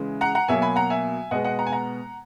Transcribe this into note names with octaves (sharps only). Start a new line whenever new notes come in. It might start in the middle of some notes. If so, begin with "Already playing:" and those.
Already playing: C#3 E3 G#3
F#5 A#5
F#5 A#5
B2 F#3 A#3 E5 G#5
G#5 B5
F#5 A#5
E5 G#5
B2 G#3 B3 D#5 F#5
D#5 F#5
F#5 A#5
G#5
F#5 A#5